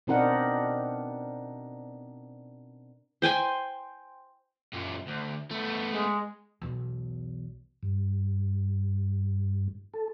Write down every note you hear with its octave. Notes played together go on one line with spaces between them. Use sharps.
B2 C4 D4 D#4 A#4 F#5
C5 G5 G#5 C6
F#2 A#2
D2
A3 B3
G#3
B1 E2
G2
A4